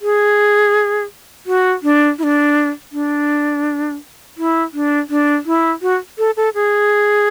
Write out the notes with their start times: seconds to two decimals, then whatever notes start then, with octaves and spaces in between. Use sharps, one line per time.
0.02 G#4
1.46 F#4
1.83 D4
2.19 E4
2.23 D4
2.92 D4
4.37 E4
4.73 D4
5.09 D4
5.46 E4
5.82 F#4
6.18 A4
6.37 A4
6.55 G#4